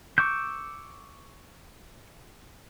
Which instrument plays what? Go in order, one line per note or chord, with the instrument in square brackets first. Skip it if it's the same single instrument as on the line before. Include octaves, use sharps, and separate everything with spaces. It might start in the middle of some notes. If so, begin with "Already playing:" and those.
[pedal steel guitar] C#6 D6 E6 G6